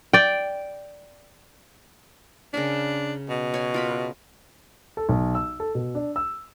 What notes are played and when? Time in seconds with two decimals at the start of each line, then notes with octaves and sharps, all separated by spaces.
0.13 D5 G5
2.54 C#3 D4 A#4 G#5
3.29 B2
3.54 C#5 G#5
3.74 F4 A#4 B5
4.97 A4
5.09 B1
5.35 E6
5.60 A4
5.75 B2
5.95 D4
6.16 E6